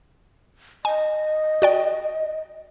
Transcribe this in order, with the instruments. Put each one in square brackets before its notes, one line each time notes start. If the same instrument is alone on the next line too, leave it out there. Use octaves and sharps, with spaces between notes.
[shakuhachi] D#5 [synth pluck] G#5
[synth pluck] F#4 D5 G5